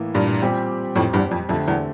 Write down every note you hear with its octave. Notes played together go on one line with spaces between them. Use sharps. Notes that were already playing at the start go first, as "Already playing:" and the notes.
Already playing: A2 E3 A#3
G2 A#2
A#2 G3 C4 G4
F2 A2
E2 G2
F2
F2 D3 A3 C4 G4
E2